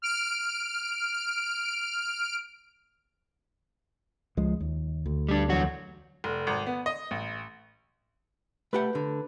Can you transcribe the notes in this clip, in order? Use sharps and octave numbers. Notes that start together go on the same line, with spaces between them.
F6 D7
C#2 F3 G#3
D#2
D2
G3 D4
E2 F#3 F#4
F1
G#1
B3
D#5
A1
A3 G4 B4 F#5 G6
D3